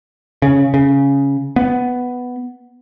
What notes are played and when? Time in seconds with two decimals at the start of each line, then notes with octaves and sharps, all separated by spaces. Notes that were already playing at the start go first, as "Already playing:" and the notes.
0.42 C#3
0.74 C#3
1.56 B3